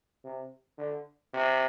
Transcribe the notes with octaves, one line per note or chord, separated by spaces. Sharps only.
C3
D3
C3